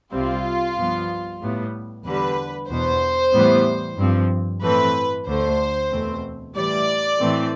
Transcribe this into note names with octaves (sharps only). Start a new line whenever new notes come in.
C2 C3 G3 C4 F4
G2 F3 B3
A2 G3 B3
E2 D3 G3 B4
E2 B2 B3 C5
A2 E3 G3 B3
G2 F3 C4
A2 E3 A3 C4 B4
D2 D3 A3 C5
E2 B2 A3 C4
A2 E3 G3 D5
A2 E3 A3 C4